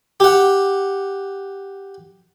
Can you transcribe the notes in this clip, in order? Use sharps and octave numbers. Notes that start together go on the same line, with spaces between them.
G4 F#5